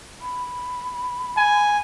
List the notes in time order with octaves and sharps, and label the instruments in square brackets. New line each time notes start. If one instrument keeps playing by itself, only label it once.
[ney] B5
[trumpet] G#5